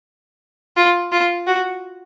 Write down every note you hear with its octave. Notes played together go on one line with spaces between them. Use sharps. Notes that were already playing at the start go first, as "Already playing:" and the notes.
F4
F4
F#4